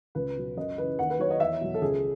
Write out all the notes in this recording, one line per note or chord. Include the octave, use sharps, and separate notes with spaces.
C#2 B4
B2 F#3
F#2 D#5
C#3 E3 B4
D#2 F#5
B4
D#3 F#3 C#5
D#5
E2 E5
B2 F#3
A4
C#2 G#4